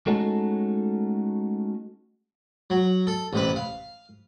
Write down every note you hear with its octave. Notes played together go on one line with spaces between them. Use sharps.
G#3 A3 C#4 D#4 F#4 A4
F#3
A4
A1 C3 B4
F5